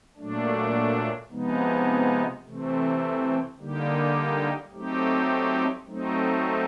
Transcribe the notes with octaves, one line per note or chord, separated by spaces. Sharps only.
A#2 F#3 A3 D4
C3 F3 G#3 B3 D#4
C3 E3 A3 C4
D3 G3 A#3 D#4 G4
F#3 A3 C4 D#4 G4
F#3 A3 C4 D#4